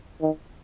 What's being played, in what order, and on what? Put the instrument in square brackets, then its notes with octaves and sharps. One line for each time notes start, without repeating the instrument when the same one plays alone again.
[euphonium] D#3